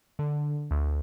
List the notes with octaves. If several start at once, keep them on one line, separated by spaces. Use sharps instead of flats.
D3
D2